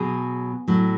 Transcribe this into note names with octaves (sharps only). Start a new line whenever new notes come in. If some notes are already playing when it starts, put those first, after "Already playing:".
Already playing: B2 F#3 G#4
A2 F#3